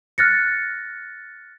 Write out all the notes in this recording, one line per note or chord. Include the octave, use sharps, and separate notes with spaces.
F6 F#6 A6 A#6 C#7